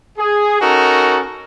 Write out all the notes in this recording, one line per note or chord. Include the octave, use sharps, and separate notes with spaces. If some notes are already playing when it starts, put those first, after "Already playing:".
G#4
C#4 D#4 F#4 A4 A#4